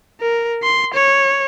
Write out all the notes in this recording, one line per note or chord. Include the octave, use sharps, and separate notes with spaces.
A#4
C6
C#5